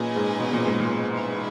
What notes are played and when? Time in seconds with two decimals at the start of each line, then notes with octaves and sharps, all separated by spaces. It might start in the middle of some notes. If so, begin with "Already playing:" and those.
Already playing: A#2 C#4 G#4 B4 D#5 G#5
0.16 G#2
0.40 B2
0.53 A#2
0.66 G#2
0.80 A#2
1.12 E4 G#4 B4